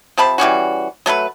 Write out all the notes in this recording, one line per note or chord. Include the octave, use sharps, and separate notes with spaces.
C3 F3 A5 B5
E3 G3 C#4 F#4
F#3 A3 A#4 B4